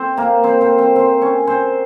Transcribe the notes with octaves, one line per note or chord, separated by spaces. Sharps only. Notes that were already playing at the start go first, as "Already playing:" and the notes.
Already playing: C4 C5
A#3 A#4
C4 C5
C4 C5
C4 C5
C4 C5
C#4 C#5
C4 C5